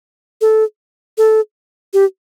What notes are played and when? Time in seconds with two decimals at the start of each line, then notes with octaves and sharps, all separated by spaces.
0.41 A4
1.18 A4
1.93 G4